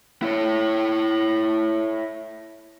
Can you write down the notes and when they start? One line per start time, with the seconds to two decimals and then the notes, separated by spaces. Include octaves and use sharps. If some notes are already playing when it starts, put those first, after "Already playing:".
0.23 E4 C#5